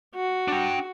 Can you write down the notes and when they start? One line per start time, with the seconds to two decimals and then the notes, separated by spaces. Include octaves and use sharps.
0.15 F#4
0.48 D4 G5